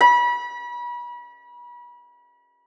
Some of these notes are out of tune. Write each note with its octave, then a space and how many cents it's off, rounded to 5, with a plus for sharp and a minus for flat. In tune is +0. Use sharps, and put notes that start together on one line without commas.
B5 -35